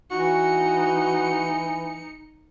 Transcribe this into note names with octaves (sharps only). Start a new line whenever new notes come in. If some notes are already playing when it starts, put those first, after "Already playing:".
E3 D#4 F#4 C#7